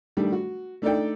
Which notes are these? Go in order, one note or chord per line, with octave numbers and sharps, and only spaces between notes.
D#3 G3 A3 D4
F#4
A3 D4 D#4 A4 D5 G5